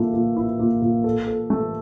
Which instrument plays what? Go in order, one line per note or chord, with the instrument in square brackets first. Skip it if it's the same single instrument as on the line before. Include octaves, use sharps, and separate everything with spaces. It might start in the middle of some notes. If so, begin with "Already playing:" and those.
Already playing: [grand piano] A#2 A3 E4
A#2
E4
A#2
A#2
A4
A4
A3